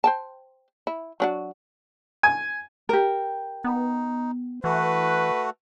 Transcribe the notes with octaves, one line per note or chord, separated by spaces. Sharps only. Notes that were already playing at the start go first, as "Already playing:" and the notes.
C5 G5 A5
E4
F#3 D4 F#4
G#5
G4 A#4
B3 D#4
E3 A3 F#4 B4